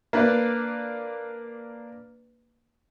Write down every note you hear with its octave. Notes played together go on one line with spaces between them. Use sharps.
A#3 D4 B4